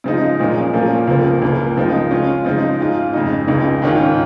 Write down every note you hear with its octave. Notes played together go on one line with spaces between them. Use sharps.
C#3 F3 G#3 D#4
A#2 F3 G#3 C#4
A#2 F3 A#3 C#4 F4
C#2 C#3 F3 A#3
C#2 C#3 A#3
C#3 F3 G#3 D#4
C#3 G#3 C#4 F4
C#3 F3 G#3 D#4
G#2 G#3 F4
F2 C#3 G#3 D#4
C#2 C#3 G#3 D#4
G#2 D#3 C#4 F4